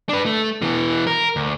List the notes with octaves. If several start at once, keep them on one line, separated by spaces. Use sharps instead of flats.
D4 B4
A3
B2 E3
A#4
D2